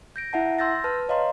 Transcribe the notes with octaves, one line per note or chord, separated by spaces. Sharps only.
G6 A#6 D7
E4 E5 F#5 A5
C6 E6 G6 A6 A#6
B4 A5 F6
C#5 D#5 F5 A#5 C6